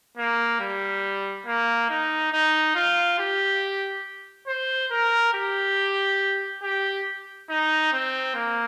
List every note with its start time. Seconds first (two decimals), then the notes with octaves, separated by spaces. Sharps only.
0.17 A#3
0.60 G3
1.46 A#3
1.89 D#4
2.32 D#4
2.75 F4
3.19 G4
4.47 C5
4.91 A#4
5.34 G4
6.63 G4
7.49 D#4
7.93 C4
8.35 A#3